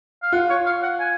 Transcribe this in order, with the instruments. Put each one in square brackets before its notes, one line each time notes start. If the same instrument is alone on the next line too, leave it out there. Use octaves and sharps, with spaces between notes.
[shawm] F5
[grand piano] F4 [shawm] F#5
[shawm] C#5
F5
F#5
G#5